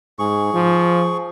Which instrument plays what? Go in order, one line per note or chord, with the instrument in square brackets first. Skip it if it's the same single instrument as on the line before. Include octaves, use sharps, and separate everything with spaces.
[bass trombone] G#2 [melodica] G#4 C#6
[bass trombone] F3